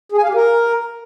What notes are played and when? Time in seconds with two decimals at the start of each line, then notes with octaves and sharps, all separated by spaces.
0.12 G#4
0.18 G#5
0.23 F5
0.29 G4
0.35 A#4